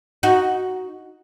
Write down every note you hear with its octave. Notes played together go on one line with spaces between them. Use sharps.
D#4 F#4